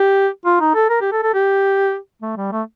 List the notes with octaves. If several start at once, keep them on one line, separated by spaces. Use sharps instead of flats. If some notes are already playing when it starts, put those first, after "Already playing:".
Already playing: G4
F4
D#4
A4
A#4
G4
A4
A4
G4
A3
G3
A3